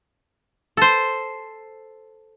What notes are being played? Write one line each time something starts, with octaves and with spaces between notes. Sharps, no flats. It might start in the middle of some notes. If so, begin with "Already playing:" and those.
A4 C5